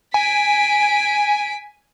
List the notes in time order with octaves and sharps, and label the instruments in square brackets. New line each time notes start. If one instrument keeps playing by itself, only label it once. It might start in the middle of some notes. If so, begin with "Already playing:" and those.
[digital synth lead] G#5 [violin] B6 D7